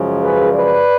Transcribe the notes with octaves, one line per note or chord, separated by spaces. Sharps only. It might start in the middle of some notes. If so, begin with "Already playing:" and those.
Already playing: F#2 C#3 F3 G#3
G#4 B4
B4 D5